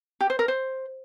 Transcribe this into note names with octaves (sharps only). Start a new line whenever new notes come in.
G4
C5
A#4
C5